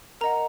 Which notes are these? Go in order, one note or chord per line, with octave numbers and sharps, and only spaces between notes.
A#4 D#5 F#5 A#5